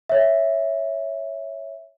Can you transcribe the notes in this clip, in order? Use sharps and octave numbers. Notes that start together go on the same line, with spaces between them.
C#5 E5